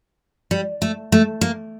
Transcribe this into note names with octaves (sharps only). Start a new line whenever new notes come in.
G3
A3
A3
A#3